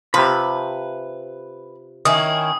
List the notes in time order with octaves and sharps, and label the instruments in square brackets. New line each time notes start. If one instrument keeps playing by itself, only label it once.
[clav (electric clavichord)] C3 F3 [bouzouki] B4 [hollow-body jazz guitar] B5
[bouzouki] D#3 C#4 E4 [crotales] D#6